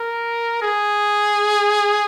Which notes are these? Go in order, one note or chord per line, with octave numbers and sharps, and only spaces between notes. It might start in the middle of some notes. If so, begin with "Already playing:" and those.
Already playing: A#4
G#4